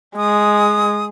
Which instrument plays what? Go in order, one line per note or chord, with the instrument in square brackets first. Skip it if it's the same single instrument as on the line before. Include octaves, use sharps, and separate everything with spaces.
[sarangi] G#3 [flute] D#6